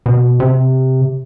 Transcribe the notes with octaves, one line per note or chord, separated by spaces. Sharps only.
B2
C3